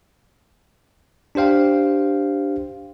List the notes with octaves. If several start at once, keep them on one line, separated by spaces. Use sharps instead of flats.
D4 G4 C5 F5 G5